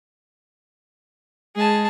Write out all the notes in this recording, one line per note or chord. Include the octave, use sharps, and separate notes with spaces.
G#3 G#4 A5